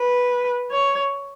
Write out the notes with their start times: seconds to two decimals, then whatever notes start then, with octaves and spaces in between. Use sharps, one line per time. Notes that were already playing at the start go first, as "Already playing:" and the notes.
Already playing: B4
0.71 C#5